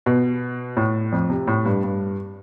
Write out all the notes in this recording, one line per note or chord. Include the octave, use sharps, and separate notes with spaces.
B2
A2
F2
C3
A2
G2
G2